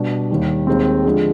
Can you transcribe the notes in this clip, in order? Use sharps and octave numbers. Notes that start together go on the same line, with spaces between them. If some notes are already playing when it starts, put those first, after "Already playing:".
Already playing: B2 G3 D4
D#2 D#3 G3
D#2 D#3 G#3 C4
D3 F3 G#3